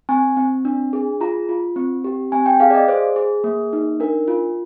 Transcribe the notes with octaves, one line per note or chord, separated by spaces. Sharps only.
C4 G#5
C4
D4
G#4
F4 A#5
F4
C4
G4
C4 G#5
G5
G#4 F5
D5
D#5
G#4 C5
G#4
A#3
D#4
D4 A#4
F4